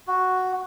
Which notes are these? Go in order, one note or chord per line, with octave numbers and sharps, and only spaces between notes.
F#4